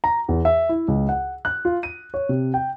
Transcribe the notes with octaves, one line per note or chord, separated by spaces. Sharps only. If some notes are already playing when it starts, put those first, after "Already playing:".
A#5
E2
E5
E4
C#2
F#5
F#6
F4
D#7
C#5
C3
G5